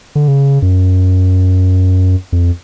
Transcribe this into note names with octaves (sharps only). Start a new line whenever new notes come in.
D3
C#3
F#2
F2